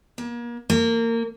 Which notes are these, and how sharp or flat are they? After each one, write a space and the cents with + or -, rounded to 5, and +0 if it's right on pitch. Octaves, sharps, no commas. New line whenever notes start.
A#3 +35
A#3 -25